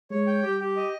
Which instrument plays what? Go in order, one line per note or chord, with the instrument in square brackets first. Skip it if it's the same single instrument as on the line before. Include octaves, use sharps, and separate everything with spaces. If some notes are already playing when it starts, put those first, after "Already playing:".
[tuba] G#3 [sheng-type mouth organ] C#5
[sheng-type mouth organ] G5
[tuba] G3 [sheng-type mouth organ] G4
[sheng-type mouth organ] G4
D#5